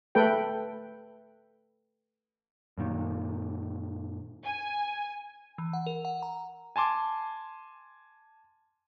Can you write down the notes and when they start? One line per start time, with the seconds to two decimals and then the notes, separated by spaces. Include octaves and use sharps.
0.15 A3 A4 B4 G5
2.78 F#2 A#2 D#3
4.43 G#5
5.58 E3
5.73 F#5
5.86 A#4
6.05 F#5
6.22 A#5
6.76 G#5 A5 C6 D6